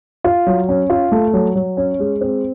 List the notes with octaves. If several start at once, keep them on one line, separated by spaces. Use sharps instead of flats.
F4
F#3
C#4
F4
A3
F#3
F#3
C#4
G#3
C4